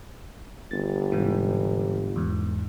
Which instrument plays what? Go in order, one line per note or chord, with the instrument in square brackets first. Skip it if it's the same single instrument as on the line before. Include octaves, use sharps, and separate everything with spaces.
[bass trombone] G1 [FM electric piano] A6
[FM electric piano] G#2 C3 E3
E2 G#2